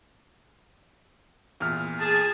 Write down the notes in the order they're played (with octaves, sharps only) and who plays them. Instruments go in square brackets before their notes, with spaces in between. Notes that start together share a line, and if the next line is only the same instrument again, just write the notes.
[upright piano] E2 A#2 F6
[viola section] G#4 [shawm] A5